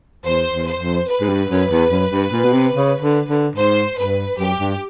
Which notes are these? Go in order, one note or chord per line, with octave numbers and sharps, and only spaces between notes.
E2 C5
E2
C5
F2
B4
G#2
G2
F#2
E2
F#2
G2
A#2
B2
C3
C#3
D3
D3
G#2 C5
G2 B4
F#2 G4
G2